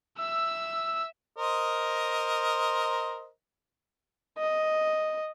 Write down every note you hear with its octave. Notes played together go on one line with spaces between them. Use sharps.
E5 E6
A#4 C5 D#5
D#5